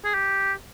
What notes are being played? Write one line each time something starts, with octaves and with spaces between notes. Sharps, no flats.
G#4
G4